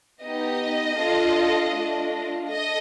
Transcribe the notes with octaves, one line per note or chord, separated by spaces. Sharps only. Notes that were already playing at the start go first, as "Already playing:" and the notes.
B3 D#4 G4 D#5
D4 F4 A4
A3 D4 F4
A4 D#5